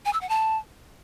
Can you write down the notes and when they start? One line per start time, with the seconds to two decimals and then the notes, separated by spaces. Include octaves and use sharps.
0.05 G#5
0.13 E6
0.21 F#5
0.29 A5